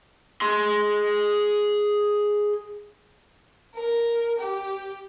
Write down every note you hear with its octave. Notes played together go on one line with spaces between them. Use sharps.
G#4 C6
A#4
G4